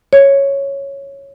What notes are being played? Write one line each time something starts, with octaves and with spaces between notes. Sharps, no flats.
C#5